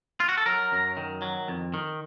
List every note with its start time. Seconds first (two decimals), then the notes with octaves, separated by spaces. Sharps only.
0.20 F4
0.29 F#4
0.38 A4
0.46 F#3 A#4
0.72 F#2
0.97 D#3
1.22 F#3
1.48 F2
1.74 D#3